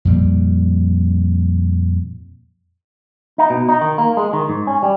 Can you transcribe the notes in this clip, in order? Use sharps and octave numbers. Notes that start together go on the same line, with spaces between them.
F2 A#2 G3
D#4
B2
D#4
D#3
A#3
G#3
D#3
G#2
C#4
G3